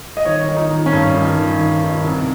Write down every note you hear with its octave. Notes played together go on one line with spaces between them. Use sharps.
D#5
D#3 C#5
D#3
D#4
D#3
C#4
G2
D#3
D#3
D#3
D#3
C2